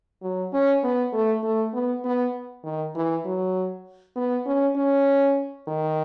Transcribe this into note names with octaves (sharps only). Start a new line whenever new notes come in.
F#3
C#4
B3
A3
A3
B3
B3
D#3
E3
F#3
B3
C#4
C#4
D#3